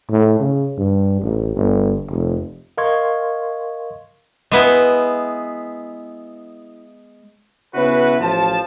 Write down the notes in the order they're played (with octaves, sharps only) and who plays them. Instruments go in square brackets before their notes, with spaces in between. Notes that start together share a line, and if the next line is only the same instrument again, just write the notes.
[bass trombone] A2
C#3
G2
A1
G1
F1
[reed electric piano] A#4 D#5 F5 C6 C#6 G#6
[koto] G#3 B3 E4
[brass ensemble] C#3 B3 C#4 E4 F#4 B4
A1 F3 A5